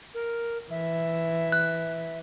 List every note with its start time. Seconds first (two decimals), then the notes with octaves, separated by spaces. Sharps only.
0.14 A#4
0.71 E3 E5
1.52 F#6